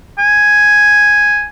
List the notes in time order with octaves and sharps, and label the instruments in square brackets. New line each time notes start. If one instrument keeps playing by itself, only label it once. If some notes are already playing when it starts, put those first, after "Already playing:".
[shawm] G#5